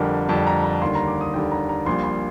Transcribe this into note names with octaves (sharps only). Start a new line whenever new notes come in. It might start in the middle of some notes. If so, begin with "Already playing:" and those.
Already playing: F2 D3 G3 A#4
F2 D3 G3 A5
A#5
A#5
D#2 D3 G3 C6
A#5
D6
D#6
D#2 D3 G3 G5
A#5
A#5
A#1 A#2 G3 C6
C6